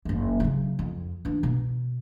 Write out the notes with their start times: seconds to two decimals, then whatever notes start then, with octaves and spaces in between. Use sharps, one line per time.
0.05 F#1 E2
0.40 C#3 F#3
0.79 F2
1.25 E3 D4
1.43 B2